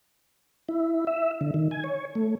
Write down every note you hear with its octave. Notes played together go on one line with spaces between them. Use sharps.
E4
E5
D3
D#3
G#5
C#5
A3